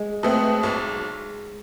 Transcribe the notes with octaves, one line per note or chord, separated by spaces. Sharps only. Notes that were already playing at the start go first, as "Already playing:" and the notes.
Already playing: G#3
B2 A3 C4
B1